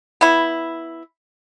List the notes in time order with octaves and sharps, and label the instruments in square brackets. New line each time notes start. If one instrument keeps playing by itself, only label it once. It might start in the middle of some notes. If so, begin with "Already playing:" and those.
[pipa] B3 E4